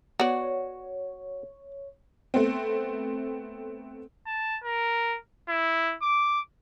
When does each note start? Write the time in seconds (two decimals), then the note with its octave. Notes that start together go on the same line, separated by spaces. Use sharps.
0.20 B3 F#4 C#5 D5
2.34 A3 B3 C4
4.26 A5
4.64 A#4
5.49 E4
6.03 D6